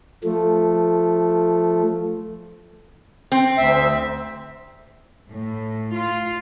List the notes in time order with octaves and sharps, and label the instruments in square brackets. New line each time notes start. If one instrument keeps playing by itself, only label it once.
[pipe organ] F3 A3
[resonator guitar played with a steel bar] C4
[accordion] D2 E5
[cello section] A2
F4